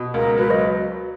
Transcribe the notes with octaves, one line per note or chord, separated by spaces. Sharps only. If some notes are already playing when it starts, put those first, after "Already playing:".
Already playing: B2
C#2 A#4
F#3 B4
D#5